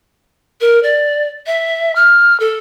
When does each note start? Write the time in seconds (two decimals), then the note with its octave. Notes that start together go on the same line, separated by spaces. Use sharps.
0.61 A#4
0.83 D5
1.46 E5
1.95 F6
2.40 A4